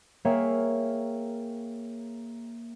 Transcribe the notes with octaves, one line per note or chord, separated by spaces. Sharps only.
A#3 G#4 C#5 E5 F5 G5